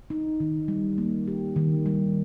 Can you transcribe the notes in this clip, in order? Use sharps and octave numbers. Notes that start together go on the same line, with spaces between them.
D#4
D#3
G3
A#3
G4
D#3
G3